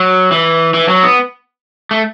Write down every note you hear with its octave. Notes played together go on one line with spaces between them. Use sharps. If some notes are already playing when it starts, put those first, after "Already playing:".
Already playing: F#3
E3
E3
F#3
B3
A3